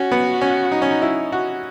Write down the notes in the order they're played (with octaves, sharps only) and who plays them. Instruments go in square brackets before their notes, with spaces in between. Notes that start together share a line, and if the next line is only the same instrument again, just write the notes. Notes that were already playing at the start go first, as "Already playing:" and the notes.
Already playing: [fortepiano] C#4 [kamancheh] F#4
[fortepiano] B3
C#4
D#4
C#4
D#4
E4
F#4